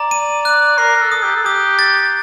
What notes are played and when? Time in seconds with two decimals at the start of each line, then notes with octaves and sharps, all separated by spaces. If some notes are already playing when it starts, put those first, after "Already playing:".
Already playing: D5 A#5
0.11 D#7
0.45 F#6
0.78 A#4 C7
0.96 A#4
1.01 A4
1.12 D#6
1.23 G4
1.36 A4
1.45 G4 D#6
1.79 A6